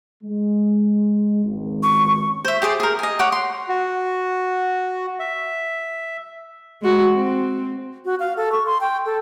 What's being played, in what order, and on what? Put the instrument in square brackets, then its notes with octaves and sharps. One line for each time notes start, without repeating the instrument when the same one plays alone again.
[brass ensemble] G#3
G#1 C#2
[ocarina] C#6
[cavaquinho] C5 E5
G4 G#4 C5 D5
G#4 A#4
D#5 G#5
C#5 F#5 D6
C6
[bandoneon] F#4
E5
[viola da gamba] G#3 F#4
C4
[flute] F#4
F5
A4
C#6
C6
G5
A4